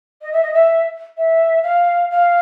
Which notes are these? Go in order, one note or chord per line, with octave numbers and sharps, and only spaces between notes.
D#5
E5
D#5
E5
E5
F5
F5